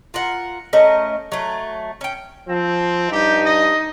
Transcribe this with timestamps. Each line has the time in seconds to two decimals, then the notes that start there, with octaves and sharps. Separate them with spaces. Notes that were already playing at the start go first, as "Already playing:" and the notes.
0.14 F4 A#4 F#5
0.73 A3 C#4 A#4 D#5
1.32 F#3 A3
2.01 C#4 G5
2.49 F3 C4
3.11 G2 D#4 G4
3.46 D#5